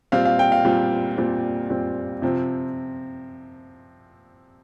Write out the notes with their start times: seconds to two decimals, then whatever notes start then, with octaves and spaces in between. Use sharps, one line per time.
0.12 A#2 G3 C4 F5
0.25 F5
0.39 G5
0.52 F5
0.65 A#2 G3 C4
1.18 A#2 G3 C4
1.70 A#2 G3 C4
2.22 C3 F3 C4